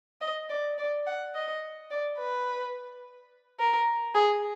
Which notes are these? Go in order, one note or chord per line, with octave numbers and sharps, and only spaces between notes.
D#5
D5
D5
F#5
D#5
D5
B4
A#4
G#4